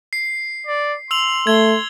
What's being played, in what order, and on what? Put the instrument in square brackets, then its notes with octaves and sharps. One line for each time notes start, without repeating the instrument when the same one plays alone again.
[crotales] C7
[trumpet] D5
[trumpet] C6 [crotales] E6 F7 F#7
[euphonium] A3 [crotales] G#6 G7